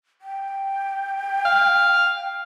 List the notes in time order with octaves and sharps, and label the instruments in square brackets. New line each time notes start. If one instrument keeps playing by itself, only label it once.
[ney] G5
[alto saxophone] F5